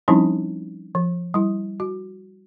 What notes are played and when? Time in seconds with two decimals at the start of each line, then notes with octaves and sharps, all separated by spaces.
0.08 F3 G3 C4 C#4 D#4 E4
0.95 F3
1.34 G3 E4
1.80 F#4